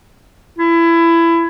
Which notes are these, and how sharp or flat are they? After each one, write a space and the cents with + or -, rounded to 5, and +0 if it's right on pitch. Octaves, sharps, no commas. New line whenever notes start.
E4 +20